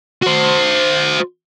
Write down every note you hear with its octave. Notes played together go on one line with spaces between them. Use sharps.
F#4 C5